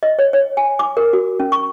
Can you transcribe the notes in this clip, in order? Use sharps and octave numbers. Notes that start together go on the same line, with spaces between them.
D#5
C#5
C#5
G#5
D6
A#4
F#4
C#4
C#6